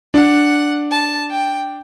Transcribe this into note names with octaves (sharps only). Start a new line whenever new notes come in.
D4 F#5
A5
G5